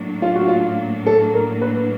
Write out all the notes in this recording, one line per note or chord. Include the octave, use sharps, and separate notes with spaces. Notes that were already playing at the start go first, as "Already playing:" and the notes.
Already playing: A2 F#3 A#3 D4
F4
F#4
F4
A4
A#4
B4